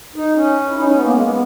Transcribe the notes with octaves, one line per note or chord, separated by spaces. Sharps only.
D#4
C#4
E4
D#4
C#4
B3
A#3
G#3
B3